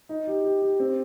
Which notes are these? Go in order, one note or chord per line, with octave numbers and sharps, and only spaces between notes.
D#4
G4
G4
G4
C4